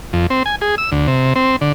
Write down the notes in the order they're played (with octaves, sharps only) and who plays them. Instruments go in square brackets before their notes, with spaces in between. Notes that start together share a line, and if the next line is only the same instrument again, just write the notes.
[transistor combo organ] F2
C4
G#5
G#4
E6
D2
C3
C4
D3